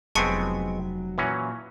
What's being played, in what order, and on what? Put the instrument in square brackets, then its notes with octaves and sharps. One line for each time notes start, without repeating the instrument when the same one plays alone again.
[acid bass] F1 [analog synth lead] F#3 [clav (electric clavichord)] G#3 B3 C4 [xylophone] A5 C#6 C#7
[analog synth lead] A#2 [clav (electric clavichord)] E3 F#3 C#4